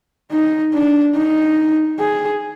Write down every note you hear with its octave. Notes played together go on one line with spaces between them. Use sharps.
D#4
D4
D#4
G#4